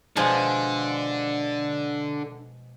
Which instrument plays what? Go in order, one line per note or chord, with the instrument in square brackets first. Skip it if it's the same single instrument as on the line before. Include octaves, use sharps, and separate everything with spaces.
[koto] B2 F3 G#3 [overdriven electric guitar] D3